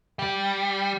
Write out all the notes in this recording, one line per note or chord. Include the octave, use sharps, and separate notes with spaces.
G3